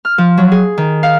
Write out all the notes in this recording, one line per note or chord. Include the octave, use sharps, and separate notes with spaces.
F6
F3
F#3
G#4
D#3
F5